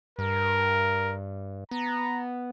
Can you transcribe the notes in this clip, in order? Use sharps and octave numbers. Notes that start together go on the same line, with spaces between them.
G2 A#4
B3 A#5